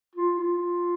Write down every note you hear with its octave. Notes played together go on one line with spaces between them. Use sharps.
F4
F4